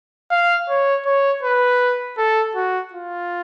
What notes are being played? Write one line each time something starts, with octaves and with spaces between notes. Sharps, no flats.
F5
C#5
C#5
B4
A4
F#4
F4